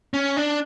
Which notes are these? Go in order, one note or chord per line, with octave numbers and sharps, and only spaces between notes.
C#4
D4